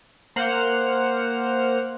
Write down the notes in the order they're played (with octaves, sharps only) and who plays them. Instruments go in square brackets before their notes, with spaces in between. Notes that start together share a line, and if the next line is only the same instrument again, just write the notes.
[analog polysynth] A#3 C5 F#5 F6